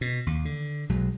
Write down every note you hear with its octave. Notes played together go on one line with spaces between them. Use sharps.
B2
D#2
D3
B1 F#3 G#3